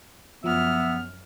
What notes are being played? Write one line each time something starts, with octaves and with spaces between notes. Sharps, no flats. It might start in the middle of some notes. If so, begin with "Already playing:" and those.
F#2 F3 B3 E5 F6